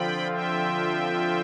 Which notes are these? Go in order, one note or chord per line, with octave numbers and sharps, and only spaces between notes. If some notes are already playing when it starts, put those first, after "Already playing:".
Already playing: D3 F3 C4 F4 G5 B5
E5 G5